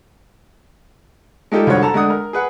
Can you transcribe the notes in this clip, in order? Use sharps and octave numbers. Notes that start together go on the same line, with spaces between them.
G#3 A3 D#4 F4 G4 A4
C2 F2 D3 F#3 C#5 F#5
A4 A5 A#5
D3 G#3 A3 D4 F#5 D#6
A#4
G#4 B4 F#5